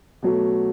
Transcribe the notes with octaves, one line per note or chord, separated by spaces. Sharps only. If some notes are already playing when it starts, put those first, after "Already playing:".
B2 F#3 A3